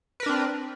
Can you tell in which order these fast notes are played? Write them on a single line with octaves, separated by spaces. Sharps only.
B4 A#4 D4 C4